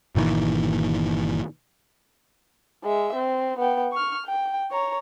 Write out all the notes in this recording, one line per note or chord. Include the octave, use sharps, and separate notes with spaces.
G1 A#2 D#3 E3
G#3 E5
C4
B3 G5
C#6 F6
G5
C#5 A#5